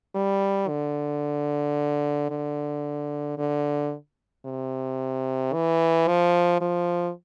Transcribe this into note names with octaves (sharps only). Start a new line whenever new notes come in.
G3
D3
D3
D3
C3
E3
F3
F3